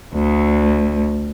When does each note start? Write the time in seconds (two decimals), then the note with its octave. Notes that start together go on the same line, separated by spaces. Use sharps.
0.14 D2